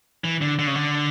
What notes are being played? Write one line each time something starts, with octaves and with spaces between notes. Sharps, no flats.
E3
D3
D3
C#3
D3